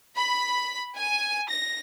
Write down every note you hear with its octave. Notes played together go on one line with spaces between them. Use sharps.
B5
G#5
A#6